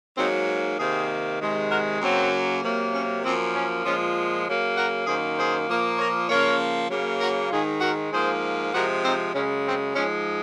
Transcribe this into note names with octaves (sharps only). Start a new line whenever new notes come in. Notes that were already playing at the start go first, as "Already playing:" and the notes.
G#2 F#3 A#3 C4 D#4
C3 D#3 A#3 G#4 C5
C3 D#3 G#3
F#4 A#4
F#2 C#3 F#3 A#3 C4
C3 F#3 A#3
C#4
F#2 F3 A#3 C4
C#4
A#2 F3 G#3 C#4 F4
C#3 F#3 A#3
F#4 A#4
F#2 D#3 A#3 G#4 C5
G#4 C5
A#2 F3 A#3
A#4 C#5
C#3 F3 A#3 A#4 C#5
C#3 F#3 A#3
F#4 A#4
G#2 D#3 G#3 F4 G#4
F#4 A#4
G#2 F3 A#3 G#4 C5
C3 F3 G#3 F#4 A#4
C4 D#4
F#2 C#3 G#3 C#4
C4
G#2 F3 G#3 C#4